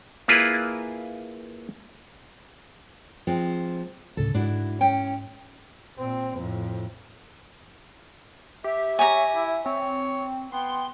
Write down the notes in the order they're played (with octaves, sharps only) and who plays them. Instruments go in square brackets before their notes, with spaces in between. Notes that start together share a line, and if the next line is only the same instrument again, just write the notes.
[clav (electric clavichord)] A#3 E4 F4 G#4 B4
[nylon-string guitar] F3 G#3 C4
[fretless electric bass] D2 A2 C#3 [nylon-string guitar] A4
[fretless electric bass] G#2 [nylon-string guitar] D4 E4 F#4
[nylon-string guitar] C#4 G5
[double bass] A#2 C4
F2 A2
[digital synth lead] G4 [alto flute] E5
[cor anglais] C#5 [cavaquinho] G#5 A#5
[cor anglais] E4
[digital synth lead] C4 [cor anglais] C#5
[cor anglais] B3 [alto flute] G5 [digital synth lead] C6